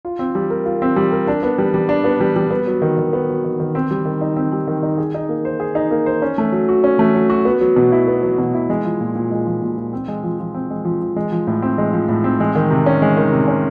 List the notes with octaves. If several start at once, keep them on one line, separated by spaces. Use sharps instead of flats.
F4
C4
G3
A#4
F4
C4
G3
A#4
D4
B3
G3
G3
D4
B3
G3
G3
B3
F#3
D#3
D#3
B3
F#3
D#3
D#3
C4
G3
D#3
D#4
C4
G3
D#3
D#4
G#4
D#4
A#3
C5
G#4
D#4
A#3
C5
C#4
A3
F#3
F#4
C#4
A3
F#3
F#4
B3
F#3
B2
E4
B3
F#3
B2
E4
G#3
F3
A#2
A#2
G#3
F3
A#2
A#2
C4
G#3
F3
F3
C4
G#3
F3
F3
G#3
F3
A2
C4
G#3
F3
A2
C4
G#3
D#3
C3
C#4
G#3
D#3
C3
C#4